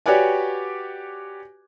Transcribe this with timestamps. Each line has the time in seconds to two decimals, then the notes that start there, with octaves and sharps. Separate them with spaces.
0.06 F#4 G4 B4 C#5 D5 G#5